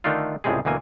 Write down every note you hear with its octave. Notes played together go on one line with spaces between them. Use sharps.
D3 D#3 A3 D4 D#4 F4
C#2 A2 C3 G3 G#3 G#4
D2 B2 E3 A#3 G#5